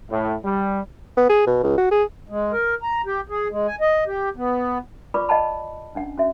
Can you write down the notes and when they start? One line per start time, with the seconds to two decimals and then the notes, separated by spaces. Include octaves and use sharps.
0.10 A2
0.45 G3
1.17 B3
1.29 G#4
1.47 B2
1.63 C#2
1.78 F#4
1.91 G#4
2.29 G#3
2.52 A#4
2.82 A#5
3.06 G4
3.30 G#4
3.51 G#3
3.67 G#5
3.81 D#5
4.07 G4
4.36 B3
5.14 F4 B4 D5 B5 C#6 D6
5.29 D#5 F#5 G5 A5 B5
5.95 C#4 D4 F#5
6.18 C#4 F#4 E5